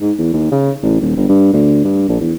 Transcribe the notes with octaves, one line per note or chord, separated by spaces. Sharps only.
G#2
E2
D#2
C#3
A1
D#1
G1
G2
D2
G2
A#1
E2